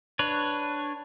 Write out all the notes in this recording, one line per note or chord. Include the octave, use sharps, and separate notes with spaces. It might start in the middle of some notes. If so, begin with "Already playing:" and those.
D4 B4 C#5